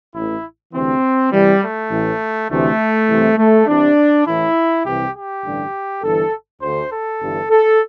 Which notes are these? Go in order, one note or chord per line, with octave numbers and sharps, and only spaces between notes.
A1 A2 E3 E4
D2 C3 E3 C4
C2 C3 E3 G3
A3
A1 A2 E3
D2 C3 E3 A3
C2 C3 E3
A3
C2 C3 E3 D4
A1 A2 E3 E4
C2 C3 E3 G4
G4
A1 G2 D3
G1 G2 E3 A4
D2 D3 C5
A4
G1 G2 E3
A4